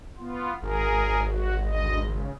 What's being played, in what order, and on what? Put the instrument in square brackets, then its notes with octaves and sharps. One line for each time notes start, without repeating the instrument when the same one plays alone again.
[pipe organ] B3 F4
[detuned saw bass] G#1 [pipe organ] G#4 A#4
[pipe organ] F#4
D2 D#5
C#3